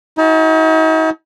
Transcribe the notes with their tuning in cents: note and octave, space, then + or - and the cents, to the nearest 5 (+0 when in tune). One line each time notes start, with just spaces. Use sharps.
D#4 +45 F#4 +0 A5 -30